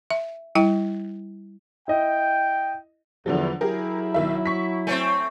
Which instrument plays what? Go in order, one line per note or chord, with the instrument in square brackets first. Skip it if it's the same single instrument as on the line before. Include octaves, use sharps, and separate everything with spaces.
[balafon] E5
G3 E4 G5
[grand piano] E4 D#5 [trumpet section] G5
[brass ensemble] E2 [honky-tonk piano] D3 F3 F#3
[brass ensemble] F#3 E4 [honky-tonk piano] G4 G#4 A#4
[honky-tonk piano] B1 D#3 E5
C#6 B6
[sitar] A3 C4 [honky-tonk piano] C#5 G#5